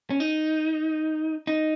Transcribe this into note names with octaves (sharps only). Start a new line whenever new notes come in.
C#4
D#4
D#4